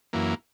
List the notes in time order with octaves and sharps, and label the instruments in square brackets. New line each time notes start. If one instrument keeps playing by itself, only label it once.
[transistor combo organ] F#2 E3 A#3